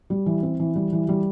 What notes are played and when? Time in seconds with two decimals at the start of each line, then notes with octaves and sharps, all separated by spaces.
0.10 G3
0.26 E3
0.43 C4
0.60 E3
0.75 G3
0.92 E3
1.09 G3